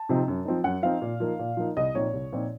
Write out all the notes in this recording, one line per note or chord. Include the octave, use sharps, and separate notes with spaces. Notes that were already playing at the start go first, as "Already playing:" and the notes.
Already playing: A5
C3 F3 C4 D#4
F#2
F3 C4 D#4
F#2 F#5
F3 C4 D#4 F5
A#2
F3 A#3 D#4
A#2
F3 A#3 D#4
C2 D#5
A#2 F3 C4 D#4 C#5
C2
A#2 F3 C4 D#4